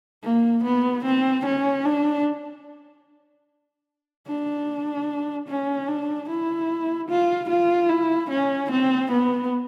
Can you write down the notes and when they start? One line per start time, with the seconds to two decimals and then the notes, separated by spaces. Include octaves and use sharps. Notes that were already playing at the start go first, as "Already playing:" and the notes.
0.23 A#3
0.64 B3
1.05 C4
1.45 C#4
1.85 D4
4.27 D4
5.48 C#4
5.88 D4
6.29 E4
7.08 F4
7.49 F4
7.89 E4
8.30 C#4
8.71 C4
9.11 B3